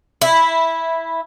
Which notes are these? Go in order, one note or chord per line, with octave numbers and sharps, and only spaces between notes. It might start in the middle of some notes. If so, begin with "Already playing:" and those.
E4